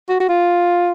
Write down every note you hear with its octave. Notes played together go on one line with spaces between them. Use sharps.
F#4
F#4
F4